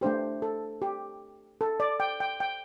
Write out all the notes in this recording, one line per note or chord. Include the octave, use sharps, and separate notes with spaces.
A3 D4 G4 C5
A4
G4
A4
D5
G5
G5
G5